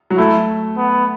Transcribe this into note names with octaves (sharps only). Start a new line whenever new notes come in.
F#3
A3 E4
B3